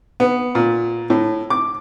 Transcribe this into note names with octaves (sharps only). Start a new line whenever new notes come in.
B3
A#2
A2
D6